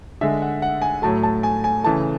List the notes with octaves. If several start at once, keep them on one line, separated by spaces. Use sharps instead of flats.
D3 G#3 E5
F#5
F#5
G#5
A2 F#3 A3 A5
A5
G#5
G#5
C#3 E3 A3 A5